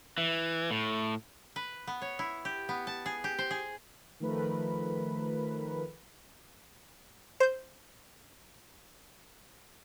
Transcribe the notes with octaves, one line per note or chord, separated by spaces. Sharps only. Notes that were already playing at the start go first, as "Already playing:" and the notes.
E3
A2
B4
B3
C#5
E4
G4
B3
A5
G#4
G4
C5
G#4
D#3 F3 A3 A#4 B4 B5
C5 G6